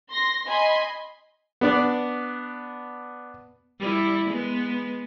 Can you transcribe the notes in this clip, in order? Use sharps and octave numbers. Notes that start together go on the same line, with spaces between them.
C6 A#6
D#5 G#5 B5 C6
B3 D4 D5
G3 E4
G#3 B3